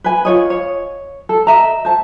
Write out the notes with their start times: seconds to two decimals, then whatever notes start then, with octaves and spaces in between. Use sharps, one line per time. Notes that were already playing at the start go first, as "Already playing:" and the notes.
0.04 B4 G#5
0.25 F4 C#5 D#5
0.50 C#5
1.29 A4
1.47 D#5 E5 A#5
1.85 C5 A5